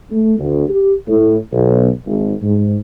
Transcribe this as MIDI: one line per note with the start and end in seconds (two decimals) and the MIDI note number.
0.11 0.35 57
0.39 0.64 38
0.70 0.95 67
1.08 1.37 45
1.53 1.89 35
2.07 2.34 32
2.42 2.77 44